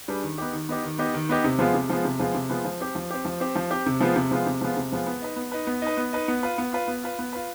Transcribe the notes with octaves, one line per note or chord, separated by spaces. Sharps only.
G3 D4 G#4 B4
D#3
B3 D#4 G4
D#3
B3 D#4 G4
D#3
B3 D#4 G4
D#3
B3 D#4 G4
C3
F3 G#3 B3 F4
C3
F3 G#3 B3 F4
C3
F3 G#3 B3 F4
C3
F3 G#3 B3 F4
F3
C4 G4
F3
C4 G4
F3
C4 G4
F3
C4 G4
C3
F3 G#3 B3 F4
C3
F3 G#3 B3 F4
C3
F3 G#3 B3 F4
C3
F3 G#3 B3 F4
B3
D#4 B4
B3
D#4 B4
B3
D#4 B4
B3
D#4 B4
B3
F4 B4
B3
F4 B4
B3
F4 B4
B3
F4 B4